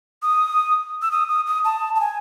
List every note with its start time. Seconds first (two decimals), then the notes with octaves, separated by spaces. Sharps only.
0.22 D#6
1.02 E6
1.12 D#6
1.29 D#6
1.46 D#6
1.65 A5
1.96 A5
2.00 G#5